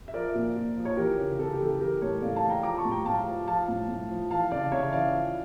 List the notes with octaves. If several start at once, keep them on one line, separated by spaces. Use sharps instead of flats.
E5
F3 A#4 D5
A#2
A#2
F3
C#5
E3 G4 A#4
C#3
C#3 A4
G4
E3
A4
E3 G4 A#4
A2 A4 C#5
A2 D5 F5
F5 A5
E3
G5 A#5
F3 A#5 D6
A5 C#6
A2
G5 A#5
A2 F5 A5
F3
F3 F5 A5
A2
A2
F3
E3 F5 A5
C#3 D5 F5
C#3 C#5 E5
E3 D5 F5
F3